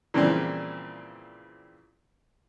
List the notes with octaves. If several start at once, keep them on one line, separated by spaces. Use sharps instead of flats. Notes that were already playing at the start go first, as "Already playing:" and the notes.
A#2 C#3 E3 F3 G3 C4